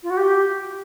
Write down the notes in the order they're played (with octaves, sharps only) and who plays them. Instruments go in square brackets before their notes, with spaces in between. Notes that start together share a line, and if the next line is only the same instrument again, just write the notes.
[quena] F4
F#4
G4